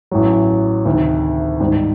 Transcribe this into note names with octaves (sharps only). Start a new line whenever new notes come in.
A1 A2 F#3
D2 C3 D#3
G#2 D#3 G3